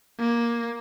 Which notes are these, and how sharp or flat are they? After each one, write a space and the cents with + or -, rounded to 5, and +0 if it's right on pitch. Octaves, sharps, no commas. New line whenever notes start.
A#3 +10